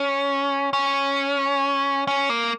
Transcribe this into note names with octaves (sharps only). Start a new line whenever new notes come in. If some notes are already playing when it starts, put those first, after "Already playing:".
Already playing: C#4
C#4
C#4
A#3